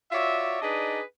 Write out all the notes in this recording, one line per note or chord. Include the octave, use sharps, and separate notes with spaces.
F4 F#4 C#5 D5 E5
D4 D#4 G#4 B4 D5 D#5